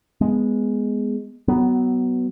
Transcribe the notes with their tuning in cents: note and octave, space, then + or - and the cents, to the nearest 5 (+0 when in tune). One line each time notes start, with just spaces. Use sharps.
G#3 +0 B3 +0
F#3 +20 B3 +0